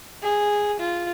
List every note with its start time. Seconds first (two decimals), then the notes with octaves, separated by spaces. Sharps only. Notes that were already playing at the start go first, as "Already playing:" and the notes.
0.22 G#4
0.79 F4